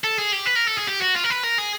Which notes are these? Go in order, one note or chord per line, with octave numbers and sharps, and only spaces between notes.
A4
G#4
G4
B4
A#4
A4
G#4
G4
F#4
F4
A#4
B4
A#4
G#4